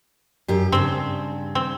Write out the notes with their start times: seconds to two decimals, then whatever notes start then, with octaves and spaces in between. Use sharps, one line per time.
0.48 F#2 G4
0.72 G2 C#3 C4
1.55 C4